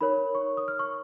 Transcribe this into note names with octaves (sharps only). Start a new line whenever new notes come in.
D#4 A#4 C#5 B5
C#6
D#6
F6
C#6